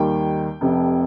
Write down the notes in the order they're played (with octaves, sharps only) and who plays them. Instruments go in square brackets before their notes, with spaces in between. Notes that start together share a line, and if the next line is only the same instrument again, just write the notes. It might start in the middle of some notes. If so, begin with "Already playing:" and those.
Already playing: [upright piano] D#2 D#3 G3 G5
F1 F2 C3